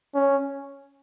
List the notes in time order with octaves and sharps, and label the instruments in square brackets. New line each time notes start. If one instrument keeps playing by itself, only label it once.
[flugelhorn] C#4